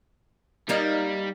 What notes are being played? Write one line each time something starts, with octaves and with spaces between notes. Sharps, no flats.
G3 A#3 D#4 D5